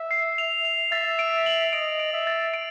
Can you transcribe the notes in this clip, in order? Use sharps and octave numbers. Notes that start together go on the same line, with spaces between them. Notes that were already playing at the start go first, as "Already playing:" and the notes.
Already playing: E5
C7
F7
F7
E5 A6
D7
F#7
D#5 D7
D7
E5
A6
D7